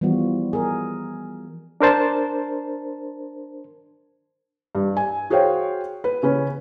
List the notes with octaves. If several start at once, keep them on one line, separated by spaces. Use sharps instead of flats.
E3 F3 G3 B3 F4 F#4
G#4 A#4
D4 A#4 C5 A5
G2
G#5
F#4 G#4 C5 C#5 F5 G5
B4
C#3 C#4 B4